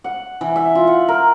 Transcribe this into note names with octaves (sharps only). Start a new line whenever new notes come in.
F#5
E3
E5
F4
F#5
A#4